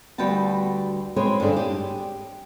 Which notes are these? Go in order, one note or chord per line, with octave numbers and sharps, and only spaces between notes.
D2 G3 F#4 B4 G5 A5
G#3 C4 B4 C#5
G2 D3 C#4 D4 G#4
G4